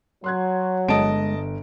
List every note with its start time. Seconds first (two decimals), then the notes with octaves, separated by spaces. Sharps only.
0.24 F#3 C6 F#6 G#6
0.89 G1 G#3 D#5 A5 D7